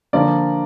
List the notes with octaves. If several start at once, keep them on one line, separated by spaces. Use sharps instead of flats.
D3 F3 A#3 D5